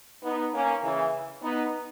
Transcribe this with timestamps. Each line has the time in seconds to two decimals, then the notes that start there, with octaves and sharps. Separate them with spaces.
0.23 B3 D#4
0.53 A#3 C#4
0.83 C#3 E3
1.42 B3 D#4